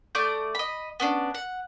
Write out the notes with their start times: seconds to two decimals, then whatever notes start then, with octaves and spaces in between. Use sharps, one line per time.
0.15 A3 D5 D#6 G6
0.55 D#5 B5
1.00 B3 C#4 D4
1.34 F#5